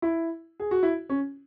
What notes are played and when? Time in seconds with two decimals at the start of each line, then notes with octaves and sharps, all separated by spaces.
0.02 E4
0.60 G#4
0.71 F#4
0.83 E4
1.09 C#4